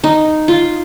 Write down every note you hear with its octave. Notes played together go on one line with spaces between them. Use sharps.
D#4
F4